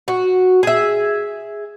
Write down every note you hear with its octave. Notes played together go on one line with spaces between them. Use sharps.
F#4
G#4 E5